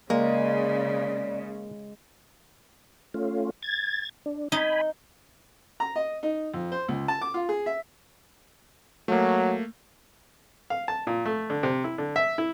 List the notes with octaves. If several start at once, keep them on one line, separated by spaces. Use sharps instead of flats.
C#3 G#3 A#3 D5
A3 C#4 F4
G#6 A6
D4
D#4 G#5 B5
A#5
D#5
D#4
F2
C5
C#2
A5
D6
F4
G#4
E5
F#3 A3 A#3
F5
A5
A#2
A3
D3
C3
E4
D3
E5
E4